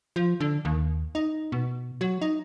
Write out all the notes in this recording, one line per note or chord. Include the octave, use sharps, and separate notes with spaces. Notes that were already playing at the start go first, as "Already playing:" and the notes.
F3
D3
D#2
D#4
B2
F#3
D#4